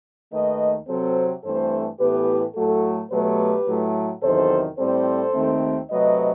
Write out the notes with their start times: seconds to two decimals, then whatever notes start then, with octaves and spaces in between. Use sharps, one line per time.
0.32 D#2 D#3 A3 B4 D#5
0.88 C3 F#3 C4 A4 C5
1.44 G2 E3 A3 C4 A4 C5
1.99 A2 E3 B3 G4 B4
2.55 A2 F#3 A3 F#4 A4
3.11 B2 F#3 A3 G4 B4
3.67 A2 F#3 A3
4.23 E2 C3 D#3 F#3 A4 C5
4.78 A2 G3 C4 A4 C5
5.34 D#2 D#3 A3 C4
5.90 C3 F#3 A3 B4 D#5